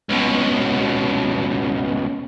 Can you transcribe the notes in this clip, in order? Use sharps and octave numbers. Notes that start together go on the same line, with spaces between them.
C#2 B2